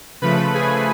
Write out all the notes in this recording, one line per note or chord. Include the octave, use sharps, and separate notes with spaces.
C#3 F3 A3 B4 B5
G#4 G#5